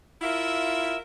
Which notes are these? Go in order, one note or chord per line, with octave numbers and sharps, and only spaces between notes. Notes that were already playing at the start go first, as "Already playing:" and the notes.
E4 F4 A#4 E5